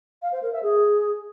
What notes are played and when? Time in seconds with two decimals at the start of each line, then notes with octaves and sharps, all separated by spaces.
0.22 F5
0.32 C5
0.42 A#4
0.52 E5
0.63 G#4